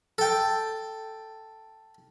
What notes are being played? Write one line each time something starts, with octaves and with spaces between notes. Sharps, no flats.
A4 G5